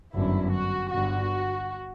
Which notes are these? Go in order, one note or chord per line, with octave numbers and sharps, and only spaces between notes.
G1 F#2 D3 E4
F#4
G1 G2 D3 F#4